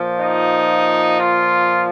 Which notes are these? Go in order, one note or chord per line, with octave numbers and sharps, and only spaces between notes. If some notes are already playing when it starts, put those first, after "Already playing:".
Already playing: A#2 F3
D#4
F4